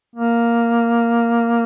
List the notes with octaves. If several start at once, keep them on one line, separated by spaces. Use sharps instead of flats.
A#3